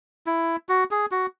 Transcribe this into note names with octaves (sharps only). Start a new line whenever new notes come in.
E4
F#4
G#4
F#4